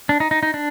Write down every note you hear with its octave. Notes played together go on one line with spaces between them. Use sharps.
D4
D#4
D#4
D#4
D4